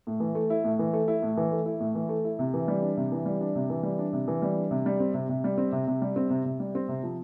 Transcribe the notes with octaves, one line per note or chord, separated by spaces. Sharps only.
A2
E3
A3
E4
A2
E3
A3
E4
A2
E3
A3
E4
A2
E3
A3
E4
C3
E3
G3
D4
C3
E3
G3
D4
C3
E3
G3
D4
C3
E3
G3
D4
C3
G3
C4
C3
C3
G3
C4
C3
C3
G3
C4
C3
C3
G3
C4
C3
F3